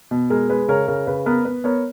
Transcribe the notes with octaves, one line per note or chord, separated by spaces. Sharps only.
B2
G#3 A#4
G#3 B4
C#3 A#4 C#5
C#3 A#4 C#5
C#3 B4
B3 A#4
B3 B4
B3 A#4 C#5